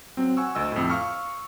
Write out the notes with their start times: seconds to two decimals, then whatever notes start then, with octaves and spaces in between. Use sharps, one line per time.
0.17 F#3 C4
0.37 F#5 G#5 C#6 E6
0.55 D2 D#5 E6
0.72 F2 A2
0.90 F5 C#6 F6